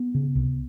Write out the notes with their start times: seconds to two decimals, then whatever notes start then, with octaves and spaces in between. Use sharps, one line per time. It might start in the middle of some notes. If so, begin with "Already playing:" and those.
Already playing: B3
0.15 C#3
0.35 C2